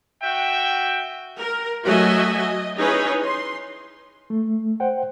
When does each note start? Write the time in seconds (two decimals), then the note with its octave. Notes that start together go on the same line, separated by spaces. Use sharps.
0.22 F#4 E5 G5
1.39 A#4
1.85 F#3 A3 F#4 D#5 E5 G#5
2.39 D#5
2.78 C#4 D#4 E4 G#4 B4 C#5
3.25 C6
4.30 A3
4.80 C5 F#5 G5